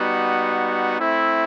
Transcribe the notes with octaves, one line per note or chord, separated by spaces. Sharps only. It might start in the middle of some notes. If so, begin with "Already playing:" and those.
Already playing: G3 B3 D#4 F#4
A3 C4 E4